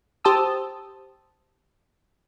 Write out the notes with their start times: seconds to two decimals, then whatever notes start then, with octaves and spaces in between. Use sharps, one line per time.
0.24 G4 C5 A5 D#6 E6